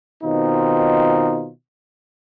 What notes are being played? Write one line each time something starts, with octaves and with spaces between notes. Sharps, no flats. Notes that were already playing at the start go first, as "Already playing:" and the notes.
B2 D#3 C4 D#4 F4